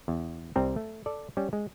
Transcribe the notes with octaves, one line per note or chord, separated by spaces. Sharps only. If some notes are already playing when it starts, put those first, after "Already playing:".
E2
C2 G3 C4 A#5
A3
A4 D5
G3 C#4
G#3